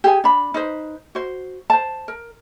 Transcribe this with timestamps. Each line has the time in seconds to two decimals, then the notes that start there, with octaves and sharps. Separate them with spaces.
0.04 G4 G#4 G#5
0.24 D4 B5
0.54 D#4 B4 C5
1.15 F#4 C5
1.70 C5 A5
2.08 A#4